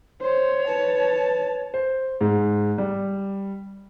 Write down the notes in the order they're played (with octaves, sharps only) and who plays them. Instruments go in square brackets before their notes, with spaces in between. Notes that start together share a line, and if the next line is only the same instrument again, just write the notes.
[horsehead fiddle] C5 [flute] C#5
[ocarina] B4 [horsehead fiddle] A5
[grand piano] C5
G#2
G3